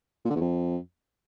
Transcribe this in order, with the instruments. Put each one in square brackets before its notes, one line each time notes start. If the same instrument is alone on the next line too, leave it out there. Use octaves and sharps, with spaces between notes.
[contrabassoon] A#2
D3
E2
F2